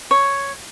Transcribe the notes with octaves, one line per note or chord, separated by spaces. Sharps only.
C#5